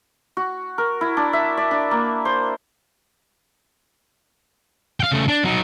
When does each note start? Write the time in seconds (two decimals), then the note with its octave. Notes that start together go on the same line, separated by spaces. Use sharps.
0.37 F#4
0.78 A#4
1.01 E4
1.17 D4
1.33 E5
1.57 D5
1.71 D4
1.91 A#3
2.25 C5
5.00 F5 G5
5.12 C#3 A3
5.28 D4
5.44 F#3 D#4